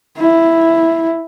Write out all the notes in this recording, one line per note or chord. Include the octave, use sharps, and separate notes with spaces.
E4